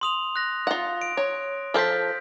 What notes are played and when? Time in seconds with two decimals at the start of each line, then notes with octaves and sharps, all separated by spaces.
0.01 C6 D#6 F7
0.36 F#6 A#6
0.67 F4 F#5
1.01 D7
1.17 C#5
1.74 F3 A4 C5 F6 G6 B6